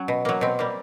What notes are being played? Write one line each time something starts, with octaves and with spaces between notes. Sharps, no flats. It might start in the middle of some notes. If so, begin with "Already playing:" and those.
Already playing: F#3 C#4
B2
F#3 A#3
B2 C4
G3 A#3